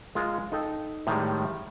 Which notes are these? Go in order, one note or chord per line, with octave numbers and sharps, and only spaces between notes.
G#3 F4 A#4
D#4 A4 G5
A2 D#3 G3 G#3